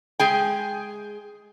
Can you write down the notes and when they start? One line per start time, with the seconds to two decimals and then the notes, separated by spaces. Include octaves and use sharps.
0.19 G#3 G#4 G5